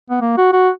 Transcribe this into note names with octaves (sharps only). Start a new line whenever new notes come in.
B3
A#3
F#4
F#4